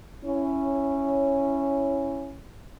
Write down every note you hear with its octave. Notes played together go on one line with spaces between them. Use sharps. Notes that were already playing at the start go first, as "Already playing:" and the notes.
C#4 E4